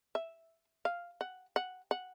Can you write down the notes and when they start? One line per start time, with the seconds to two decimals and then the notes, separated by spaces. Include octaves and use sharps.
0.15 E5
0.85 F5
1.21 F#5
1.56 F#5
1.91 F#5